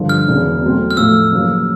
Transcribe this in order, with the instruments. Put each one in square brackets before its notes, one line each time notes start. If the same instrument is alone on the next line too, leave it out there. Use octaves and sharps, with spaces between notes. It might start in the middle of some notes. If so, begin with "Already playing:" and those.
Already playing: [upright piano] G2 D3 F3
[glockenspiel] F6
[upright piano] E1 E2 C#3
B2 F#3 A3 C4
[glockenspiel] F6
[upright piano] A2 F3 A3 [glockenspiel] E6
[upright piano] F#2 C#3 F3 A#3